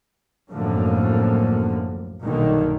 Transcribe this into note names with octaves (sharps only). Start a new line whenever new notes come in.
C2 F#2 A2 D3 F3 A#3
B1 G2 A#2 D3 D#3